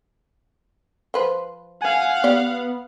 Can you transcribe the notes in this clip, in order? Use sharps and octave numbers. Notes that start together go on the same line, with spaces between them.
F3 B4 C5
F5 F#5 G#5
B3 G4 D5